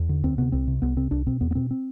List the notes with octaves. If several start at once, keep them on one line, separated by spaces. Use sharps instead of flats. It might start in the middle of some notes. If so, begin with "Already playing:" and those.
Already playing: E2
D3
D2 C4
C3 B3
C2 C4
C3
C2 B3
C3 C4
C2 D4
B2 C4
E2 B3
B3
B2 C4
C4